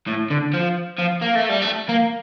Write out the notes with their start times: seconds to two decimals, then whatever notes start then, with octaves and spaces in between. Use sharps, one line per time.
0.07 A2
0.30 D3
0.54 F3
0.98 F3
1.21 A#3
1.35 A3
1.49 G3
1.62 A3
1.89 A#3